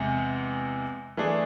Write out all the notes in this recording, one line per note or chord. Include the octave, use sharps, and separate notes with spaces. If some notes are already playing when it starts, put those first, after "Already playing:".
Already playing: E2 C3 G#3
E3 A3 D4 G#4